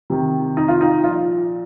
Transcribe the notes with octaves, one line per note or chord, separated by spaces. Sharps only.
C3 D#3
D#4
F4
D#4
A#2 F3 F4